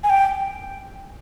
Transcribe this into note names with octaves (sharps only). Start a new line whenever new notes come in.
G#5
G5